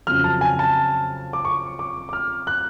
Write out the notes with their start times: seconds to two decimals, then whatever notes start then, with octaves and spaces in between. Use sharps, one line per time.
0.07 F2 C#3 F#3 F6
0.24 A5
0.41 G#5
0.59 A5
1.33 D6
1.45 C#6
1.79 D6
2.09 D6
2.13 F6
2.47 F#6